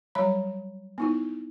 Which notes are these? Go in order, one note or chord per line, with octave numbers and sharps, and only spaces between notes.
F#3 G3 C#5 A#5 B5
B3 D#4 E4